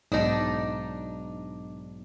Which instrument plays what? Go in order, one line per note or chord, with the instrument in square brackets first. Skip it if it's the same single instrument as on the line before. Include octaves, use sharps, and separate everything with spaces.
[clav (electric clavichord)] B1 G#2 D#5 [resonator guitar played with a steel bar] D4 D#4